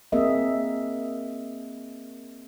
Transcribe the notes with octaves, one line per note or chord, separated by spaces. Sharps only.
A#3 C4 G#4 A#4 D#5 E5